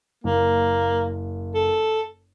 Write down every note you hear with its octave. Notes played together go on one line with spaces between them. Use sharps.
F#1 A#3
A4